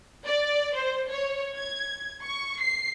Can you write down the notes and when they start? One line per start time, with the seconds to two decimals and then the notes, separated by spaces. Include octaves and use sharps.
0.25 D5
0.74 C5
1.08 C#5
1.55 G#6
2.22 C#6
2.60 C7